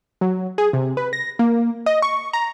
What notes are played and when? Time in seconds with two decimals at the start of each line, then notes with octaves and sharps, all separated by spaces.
0.21 F#3
0.58 G#4
0.73 C3
0.97 B4
1.13 A#6
1.39 A#3
1.86 D#5
2.02 C#6
2.33 A#5